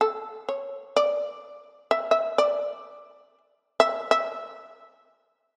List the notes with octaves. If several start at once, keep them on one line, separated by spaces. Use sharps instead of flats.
A4
C#5
D5
E5
E5
D5
E5
E5